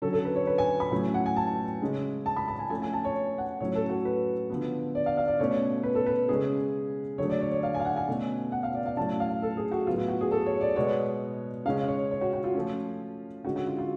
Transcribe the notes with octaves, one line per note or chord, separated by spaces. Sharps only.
D3 F#3 C#4 A4
A4
B4
C#5
B4
G#5
B5
A2 F#3 C#4
F#5
G#5
A5
C#3 G#3 C#4
A5
B5
A5
G#5
F3 A3 C#4 G#5
G#5
A5
C#5
F#5
A2 F#3 C#4 C#5
A4
F#4
B4
D3 F3 B3
D5
F5
F5
D5
B2 A3 C#4 C#5
B4
A4
B4
C#3 G#3 C#4 G#4
D3 F#3 A3 C#5
D5
C#5
C#5
F5
G#5
F5
F#5
G#5
B2 A3 C#4
F#5
F5
D5
F5
A2 F#3 C#4 A5
F5
A4
G#4
F#4
A2 F#3 B3 F4
F4
F#4
G#4
A4
C#5
D5
B2 G#3 B3 C#5
C#3 G#3 C#4 F5
C#5
C#5
F#4
F#4
F4
F3 A3 C#4
D3 G#3 C#4 F#4
F#4
F4
F4